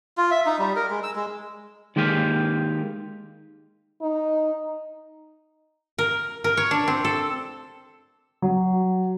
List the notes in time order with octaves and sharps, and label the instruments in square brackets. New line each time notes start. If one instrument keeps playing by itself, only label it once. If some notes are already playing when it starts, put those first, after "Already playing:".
[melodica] F4
E5
D#4
G3
A#4
G#3
E6
G#3
[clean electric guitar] D#3 G#3 A#3 G4 F5
[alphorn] D#4
[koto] A#4
A#4
C#5
D4
C4
A4
[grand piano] F#3